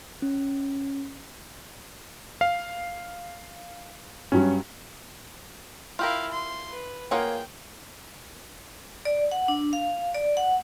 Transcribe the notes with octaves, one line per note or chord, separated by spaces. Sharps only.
C#4
F5
G2 F#3 C#4
E4 F4 G4 A#4 F5
C6
B4
A#3 F4 G#4 A#4 C#5 F#5 G5
D5
F#5
D4
F5
D5
F#5